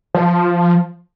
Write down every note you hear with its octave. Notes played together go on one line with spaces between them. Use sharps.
F3